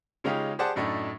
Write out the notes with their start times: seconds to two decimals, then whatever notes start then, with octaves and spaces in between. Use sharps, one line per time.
0.24 C#3 G#3 C#4 D#4 F4 G4
0.59 G4 G#4 C5 D5 F#5 A5
0.76 F#2 A2 A3 D4 D#4